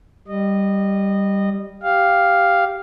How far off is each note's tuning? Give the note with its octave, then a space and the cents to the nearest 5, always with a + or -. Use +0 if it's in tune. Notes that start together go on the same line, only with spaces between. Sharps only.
G3 +0 D#5 -20
G4 +0 F5 +0